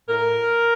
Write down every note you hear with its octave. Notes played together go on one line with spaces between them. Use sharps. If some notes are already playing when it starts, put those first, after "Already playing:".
A2 A#4